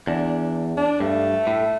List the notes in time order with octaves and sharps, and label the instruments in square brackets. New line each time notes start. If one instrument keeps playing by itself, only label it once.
[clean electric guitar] E2 [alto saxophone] D4
[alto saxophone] D4
[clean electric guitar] G2 [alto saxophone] A3
[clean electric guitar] A2